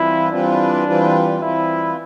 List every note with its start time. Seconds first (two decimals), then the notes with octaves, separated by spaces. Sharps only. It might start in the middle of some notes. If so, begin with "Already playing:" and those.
Already playing: E3 G3 C4 E4 F4 B4
0.32 E3 G3 C4 D4 F4 B4
0.87 E3 G3 C4 F4 B4
1.41 E3 G3 C4 E4 F4 B4